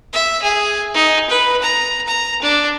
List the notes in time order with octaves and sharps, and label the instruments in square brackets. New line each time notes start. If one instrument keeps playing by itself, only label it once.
[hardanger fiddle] E5
G#4
D#4
B4
A#5
A#5
D4